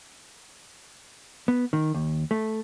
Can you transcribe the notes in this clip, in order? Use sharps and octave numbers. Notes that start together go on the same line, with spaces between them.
B3
D#3
D#2
A3